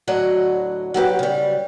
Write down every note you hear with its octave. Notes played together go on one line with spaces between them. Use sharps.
D2 A2 F#3 D5 D#5 F#5
F#3 F#4 G4 B4
C#3 G3